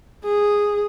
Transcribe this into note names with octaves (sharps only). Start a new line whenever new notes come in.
G#4